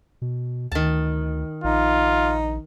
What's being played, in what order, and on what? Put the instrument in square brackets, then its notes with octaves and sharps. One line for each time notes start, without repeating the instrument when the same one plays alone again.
[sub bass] B2
[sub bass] D2 [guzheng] D#3 A5
[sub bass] A#1 [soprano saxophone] D#4 [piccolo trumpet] F4